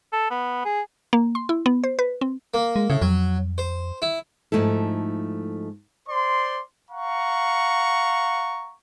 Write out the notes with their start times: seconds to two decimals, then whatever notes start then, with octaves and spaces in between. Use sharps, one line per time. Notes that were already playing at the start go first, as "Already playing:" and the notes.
0.12 A4
0.31 B3
0.65 G#4
1.13 A#3
1.35 C6
1.49 E4
1.66 B3
1.84 C5
1.99 B4
2.21 C4
2.54 A#3
2.76 G#3
2.90 A2 C#3
3.02 F2 F#3
3.58 C5
4.02 E4
4.52 G#2 F3 A3 D#4 E4 A4
6.09 C5 D5 C6
6.91 F5 F#5 A#5 C#6